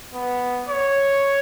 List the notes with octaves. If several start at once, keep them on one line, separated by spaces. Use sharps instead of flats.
B3
C#5